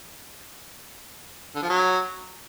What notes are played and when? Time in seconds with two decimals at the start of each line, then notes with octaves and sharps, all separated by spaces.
1.55 D3
1.62 F3
1.70 F#3